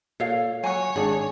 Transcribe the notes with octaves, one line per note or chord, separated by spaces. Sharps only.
A#2 A4 C#5 F5
F#3 F#4 C#5 G#5
G#1 D4 G#4